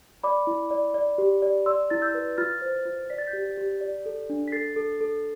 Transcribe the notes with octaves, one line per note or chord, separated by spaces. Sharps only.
D5 B5 D6
E4
D5
D5
G4
D5
D5 C6 E6
E4 A6
E6 G6
B4
F4 F6 A6
C5
F4
D5 B6
A6
G6 B6
G4
G4
D5
A4
D4
B6
A4 A6 C7
A4
A4